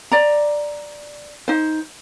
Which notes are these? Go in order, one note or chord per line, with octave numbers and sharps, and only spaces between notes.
D5 A#5
D#4 C5